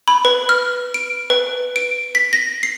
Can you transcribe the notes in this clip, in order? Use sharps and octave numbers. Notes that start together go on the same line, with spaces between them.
B5
B4
F6
D7
B4
D7
B6
A#6
C7